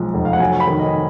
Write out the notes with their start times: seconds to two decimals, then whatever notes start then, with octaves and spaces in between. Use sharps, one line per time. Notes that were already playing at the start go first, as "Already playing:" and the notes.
Already playing: B1 F3 G#3
0.14 F1
0.25 F5
0.33 F#5
0.40 F#3 G#5
0.60 B5
0.67 D#3
0.80 D#5